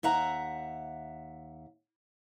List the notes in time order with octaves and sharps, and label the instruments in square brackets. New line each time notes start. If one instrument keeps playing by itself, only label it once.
[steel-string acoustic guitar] D#2 E5 F#5 A#5